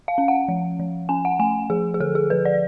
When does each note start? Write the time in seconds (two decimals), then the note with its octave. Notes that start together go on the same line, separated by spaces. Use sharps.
0.08 F5
0.18 C#4
0.28 F#5
0.48 F3
0.79 F3
1.09 C#4 G#5
1.25 F#5
1.39 A3 G#5
1.70 F3 G#4
1.94 G#4
2.00 D3 A4
2.15 G#4
2.30 F3 B4
2.45 D5